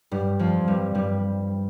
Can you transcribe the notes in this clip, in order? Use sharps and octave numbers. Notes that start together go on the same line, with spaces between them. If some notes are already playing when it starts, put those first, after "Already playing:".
G2 G3
F2 F3
G2 G3
G2 G3